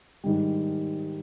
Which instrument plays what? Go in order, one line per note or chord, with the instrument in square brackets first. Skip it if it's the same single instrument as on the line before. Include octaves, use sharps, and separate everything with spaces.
[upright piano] G#2 D#3 G3